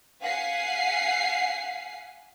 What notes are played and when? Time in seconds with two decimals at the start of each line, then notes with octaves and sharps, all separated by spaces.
0.21 F5 F#5 G#5 B6 C7